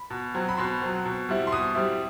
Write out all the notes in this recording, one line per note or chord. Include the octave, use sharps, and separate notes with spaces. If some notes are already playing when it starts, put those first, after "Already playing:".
Already playing: B5
B2
F#3 C4
B5
B2 C6
F#3 C4
B2
G3 C4 E4
C6
B2 D#6
G3 C4 E4